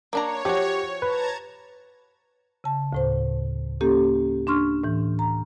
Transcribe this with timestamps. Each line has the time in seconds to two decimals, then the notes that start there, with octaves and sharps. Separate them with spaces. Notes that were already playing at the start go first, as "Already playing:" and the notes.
0.13 A#3 D4 C#5 A#5
0.45 F3 F#4 G4
1.02 B4 A5 A#5 G#6
2.64 C#3 A5
2.93 D2 A2 C5
3.81 A#3 C#4 G4 A4
4.47 D4 C6 C#6 F6
4.83 A2 E3
5.19 A#5